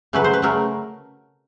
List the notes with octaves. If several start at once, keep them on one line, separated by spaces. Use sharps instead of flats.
C#3 F#3 A3 B4
C5
B4
C#3 F#3 A3 A#4